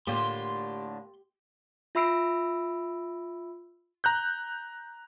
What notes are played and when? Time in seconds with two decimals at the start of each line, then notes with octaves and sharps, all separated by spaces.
0.07 A2 D3 A#3 F4 G4 C6
1.95 F4 E5 B5 E6 C7 D7
4.04 A#5 F#6 G6